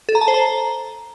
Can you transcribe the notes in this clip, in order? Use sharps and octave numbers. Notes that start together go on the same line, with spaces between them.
A4
A#5
A5
C5
A#5